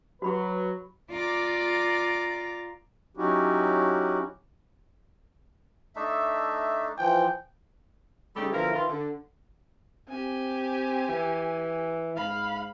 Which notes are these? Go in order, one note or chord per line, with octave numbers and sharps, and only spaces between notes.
F#3 F#4 B4 B5 C#6
F4 D5 A#5 D6
F#3 C#4 D#4 E4 F#4 G4
A3 D4 D#4 E5
E3 F3 G5
C#3 G3 A3 D#4 G4
B2 D3 E3 F3 E4 A#4
D#3 E3 F4
D3
C4 G4 G#5
E3
G#2 F5 B5